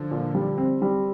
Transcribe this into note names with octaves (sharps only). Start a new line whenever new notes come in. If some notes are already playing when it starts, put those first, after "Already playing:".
Already playing: D3 F3
A#2
G3
C4
G3